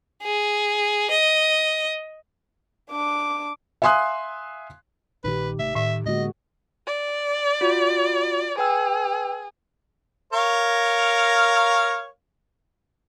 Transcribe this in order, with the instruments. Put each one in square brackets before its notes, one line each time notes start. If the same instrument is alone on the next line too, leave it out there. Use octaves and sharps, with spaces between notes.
[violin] G#4
D#5
[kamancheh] D4 D6
[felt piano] E5 F5 G#5 C6 D#6 F#6
[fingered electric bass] A#1 A#2 D#3 [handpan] D#4 G4 [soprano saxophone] B4
[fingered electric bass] G#1 C3 A3 [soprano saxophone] E5
[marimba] A2 [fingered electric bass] D#3 [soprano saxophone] E5
[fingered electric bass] D3 B3 [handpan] G#3 A#3 F#4 [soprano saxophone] D#5
[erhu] D5
[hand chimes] F4 F#4
[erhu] G#4 [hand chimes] B4 G5 E6
[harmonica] A#4 C#5 F5